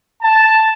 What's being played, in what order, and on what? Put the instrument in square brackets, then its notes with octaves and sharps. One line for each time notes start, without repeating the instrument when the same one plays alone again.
[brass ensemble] A5